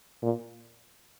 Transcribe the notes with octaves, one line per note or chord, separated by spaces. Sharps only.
A#2